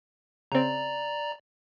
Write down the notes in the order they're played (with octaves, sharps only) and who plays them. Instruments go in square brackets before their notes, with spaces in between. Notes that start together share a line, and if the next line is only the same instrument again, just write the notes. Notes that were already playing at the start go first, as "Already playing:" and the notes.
[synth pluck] C#3 C4 [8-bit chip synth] D5 A#5